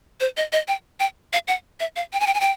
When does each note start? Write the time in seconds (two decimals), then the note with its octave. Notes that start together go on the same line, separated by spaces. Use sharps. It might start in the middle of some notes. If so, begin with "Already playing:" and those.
0.20 C5
0.37 D#5
0.53 D#5
0.68 G5
1.00 G5
1.33 F5
1.48 F#5
1.80 E5
1.96 F5
2.13 G5
2.20 G#5
2.27 G5
2.34 G#5
2.41 G5